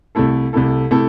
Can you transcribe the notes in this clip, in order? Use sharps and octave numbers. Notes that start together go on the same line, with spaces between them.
C2 C3 A3 E4 A4
C2 C3 A3 E4 A4
C3 A3 E4 A4